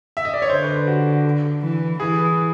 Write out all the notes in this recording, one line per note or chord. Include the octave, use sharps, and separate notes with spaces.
E5
D#5
D5
C#5
D3 C5
B4
C5
F#4
E3
E3 G#4